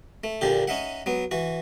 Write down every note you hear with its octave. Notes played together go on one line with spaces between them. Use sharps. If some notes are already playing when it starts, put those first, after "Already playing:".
A3
A#1 A#2 D3 G4
C#4 D#4 E5 F#5
F#3 B3
E3 F#4